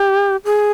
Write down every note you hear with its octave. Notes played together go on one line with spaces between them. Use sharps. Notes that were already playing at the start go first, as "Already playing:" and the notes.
Already playing: G4
G#4